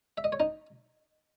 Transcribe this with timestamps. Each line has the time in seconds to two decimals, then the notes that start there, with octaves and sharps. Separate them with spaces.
0.18 E5
0.24 D#5
0.32 C#5
0.40 D#4 D#5